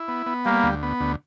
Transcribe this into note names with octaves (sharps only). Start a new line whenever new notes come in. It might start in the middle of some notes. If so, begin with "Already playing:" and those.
Already playing: E4
B3
B3
G3 A#3
D2
B3
D2